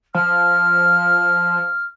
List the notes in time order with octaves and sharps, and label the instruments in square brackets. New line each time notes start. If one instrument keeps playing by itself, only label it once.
[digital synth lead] F3 [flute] F6